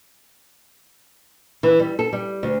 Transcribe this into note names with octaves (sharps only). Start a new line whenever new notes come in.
E3
G3
A4
G3
D2